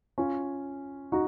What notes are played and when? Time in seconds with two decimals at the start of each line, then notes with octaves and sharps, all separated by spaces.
0.18 C#4 F4
1.12 D#4 F#4